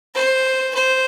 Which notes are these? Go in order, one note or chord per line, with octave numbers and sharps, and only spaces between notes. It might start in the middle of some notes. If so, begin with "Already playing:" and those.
C5
C5